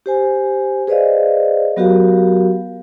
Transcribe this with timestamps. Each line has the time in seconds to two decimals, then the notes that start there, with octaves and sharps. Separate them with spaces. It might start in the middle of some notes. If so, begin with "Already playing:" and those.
0.06 G4 C5 G#5
0.87 G#4 B4 C5 D5 D#5 F5
1.77 F#3 B3 F#4 G4 A#4 F5